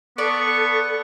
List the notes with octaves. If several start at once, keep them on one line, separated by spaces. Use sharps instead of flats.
B3 A4 D5 C#6